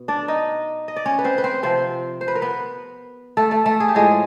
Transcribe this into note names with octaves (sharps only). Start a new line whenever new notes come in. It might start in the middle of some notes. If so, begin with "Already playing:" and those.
Already playing: B2
D4 D5
D#4 D#5
D#5
D5
C#4 C#5
B4
C4 C5
B4
C4 C5
C3 F3 C4 C5
C5
B4
A#4
B3 B4
A3 A4
A3 A4
A3 A4
G#4
G4
A2 F3 G#3 G#4